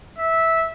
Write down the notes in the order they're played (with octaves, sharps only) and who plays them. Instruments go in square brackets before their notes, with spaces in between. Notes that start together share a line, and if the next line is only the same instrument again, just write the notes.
[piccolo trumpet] E5